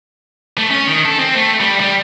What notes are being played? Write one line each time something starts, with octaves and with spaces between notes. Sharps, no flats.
A3
C#4
D#3
A4
C4
A3
G3
G3